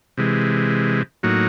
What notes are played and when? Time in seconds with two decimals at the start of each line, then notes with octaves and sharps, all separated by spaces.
0.17 C3 E3 G#3
1.23 A2 F#3 A#3 D#4 F#4